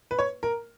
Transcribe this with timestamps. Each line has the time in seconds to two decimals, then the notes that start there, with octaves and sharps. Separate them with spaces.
0.11 B4
0.19 C#5
0.43 A#4